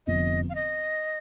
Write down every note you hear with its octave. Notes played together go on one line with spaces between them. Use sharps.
F1 F2 D3 F3 B3 D#5
F5
D#5